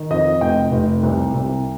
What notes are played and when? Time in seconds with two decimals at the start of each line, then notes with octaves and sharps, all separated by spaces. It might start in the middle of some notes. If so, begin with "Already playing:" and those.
Already playing: D#3
0.10 F2 D#5
0.41 F1 G5
0.72 F1
1.03 C2
1.34 C2